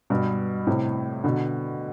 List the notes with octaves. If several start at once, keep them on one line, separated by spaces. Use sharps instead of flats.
G2 B2
A2 C3
B2 D3